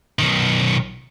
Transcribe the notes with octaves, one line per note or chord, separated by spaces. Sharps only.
B1 D#3